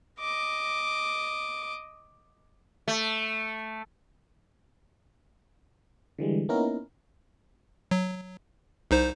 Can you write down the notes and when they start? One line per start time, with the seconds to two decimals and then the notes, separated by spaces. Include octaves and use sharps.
0.20 D#5 D6
2.88 A3
6.19 D3 E3 G3 G#3
6.49 A#3 B3 C#4 D#4 E4 A#4
7.91 F#3
8.91 C2 D#4 C5